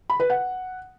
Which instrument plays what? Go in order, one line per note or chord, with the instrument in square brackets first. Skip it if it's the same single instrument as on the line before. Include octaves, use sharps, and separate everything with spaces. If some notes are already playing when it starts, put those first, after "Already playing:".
[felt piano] B5
B4
F#5